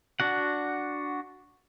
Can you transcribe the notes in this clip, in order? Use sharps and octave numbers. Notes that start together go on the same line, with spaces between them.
D4 F#4 F#5